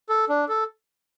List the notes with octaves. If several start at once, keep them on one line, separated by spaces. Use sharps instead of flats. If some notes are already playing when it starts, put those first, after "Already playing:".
A4
D4
A4